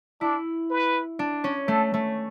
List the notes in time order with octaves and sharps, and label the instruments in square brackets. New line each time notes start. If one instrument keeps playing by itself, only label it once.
[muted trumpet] D4 [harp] E4
[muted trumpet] B4
[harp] D4
C#4
[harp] A3 [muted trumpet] A4
[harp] A3